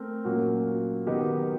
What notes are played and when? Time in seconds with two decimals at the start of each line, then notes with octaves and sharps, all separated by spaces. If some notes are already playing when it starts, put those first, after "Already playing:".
Already playing: A3 C4 A#4
0.24 A#2 F#3 A#3 C#4 F#4
1.07 D#3 F#3 B3 D#4 G4